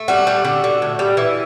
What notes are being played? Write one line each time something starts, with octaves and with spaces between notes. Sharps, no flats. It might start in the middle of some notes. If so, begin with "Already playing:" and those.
Already playing: A3
G3 F#4
G3
D3
D3
A2
G3
E3